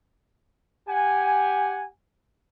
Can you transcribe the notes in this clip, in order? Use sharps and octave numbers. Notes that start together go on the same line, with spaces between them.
G4 F#5 G#5